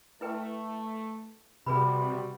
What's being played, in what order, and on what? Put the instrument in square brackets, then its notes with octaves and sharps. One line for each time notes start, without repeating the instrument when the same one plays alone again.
[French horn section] A3 [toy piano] E4 B4 G5
[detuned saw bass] C3 [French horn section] G3 B3 F#4 [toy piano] G#4 B4 B5